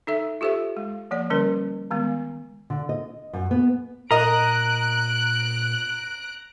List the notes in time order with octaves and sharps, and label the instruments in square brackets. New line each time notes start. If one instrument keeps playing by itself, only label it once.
[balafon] D#4 A4 E5
F4 G4 A4 C5 E5
G#3
F3 A#3 D5
D3 G3 C#4 A#4
D#3 G#3 B3
[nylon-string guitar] D3
D#5
F#2
B3
[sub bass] A#2 [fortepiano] A#4 D#5 [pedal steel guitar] A#5 [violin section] F#6 D7